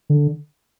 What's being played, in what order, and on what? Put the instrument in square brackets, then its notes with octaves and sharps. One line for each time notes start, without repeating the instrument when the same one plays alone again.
[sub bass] D3